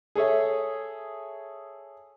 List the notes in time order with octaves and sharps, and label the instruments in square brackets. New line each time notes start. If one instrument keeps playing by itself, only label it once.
[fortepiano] G#4 A4 C#5 E5